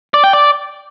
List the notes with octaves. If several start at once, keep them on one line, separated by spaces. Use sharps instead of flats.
D5
G5
D5